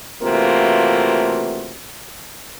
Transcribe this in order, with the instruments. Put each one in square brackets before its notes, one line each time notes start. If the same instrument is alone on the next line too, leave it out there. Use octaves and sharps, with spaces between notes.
[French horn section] C3 E3 A3 A#3 F4 F#4